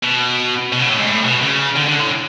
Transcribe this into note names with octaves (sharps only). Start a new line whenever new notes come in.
B2
B2
C#3
A2
G#2
A2
B2
C#3
D3
D3
A2